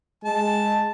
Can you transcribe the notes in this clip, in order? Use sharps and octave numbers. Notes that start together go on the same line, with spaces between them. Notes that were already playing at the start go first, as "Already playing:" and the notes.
G#3 A5